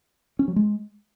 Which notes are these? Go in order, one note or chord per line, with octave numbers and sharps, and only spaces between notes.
C#4
F#3
G#3